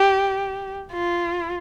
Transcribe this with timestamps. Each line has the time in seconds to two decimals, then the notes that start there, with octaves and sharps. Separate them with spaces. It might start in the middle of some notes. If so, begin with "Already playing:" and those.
Already playing: G4
0.92 F4